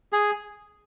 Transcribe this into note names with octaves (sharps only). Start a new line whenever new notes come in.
G#4